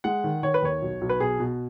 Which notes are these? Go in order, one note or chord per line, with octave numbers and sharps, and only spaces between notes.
G#3 F#5
D#3
D#3 C#5
B4
D#2 C#5
B1
B1
B4
B2 G#4
B2